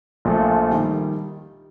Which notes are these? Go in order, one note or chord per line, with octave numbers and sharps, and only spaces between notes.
A#1 A#2 F3 A3
D#3 G3